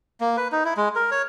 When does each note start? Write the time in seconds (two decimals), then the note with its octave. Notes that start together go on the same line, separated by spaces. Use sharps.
0.21 A#3
0.37 B4
0.52 D#4
0.65 E4
0.77 G#3
0.96 A#4
1.11 C#5